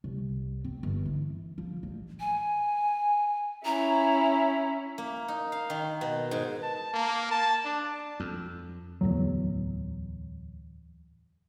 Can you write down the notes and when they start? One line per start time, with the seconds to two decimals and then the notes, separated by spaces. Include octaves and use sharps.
0.04 C2
0.64 C4
0.83 G1
1.05 E3
1.58 F3
1.83 A1
2.20 G#5
3.65 C#4 E4 A#5
4.98 A#3
5.28 D#4
5.52 F5
5.70 D#3
6.01 B2
6.31 G#2
6.63 A5
6.93 A#3
7.31 A5
7.65 D4
8.20 F2
9.01 D1 G1 E2 F#3